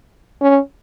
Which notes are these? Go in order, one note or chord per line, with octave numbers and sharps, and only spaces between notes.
C#4